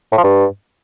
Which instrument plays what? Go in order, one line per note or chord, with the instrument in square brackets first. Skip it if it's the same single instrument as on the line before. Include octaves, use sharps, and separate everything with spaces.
[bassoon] A2
F3
G2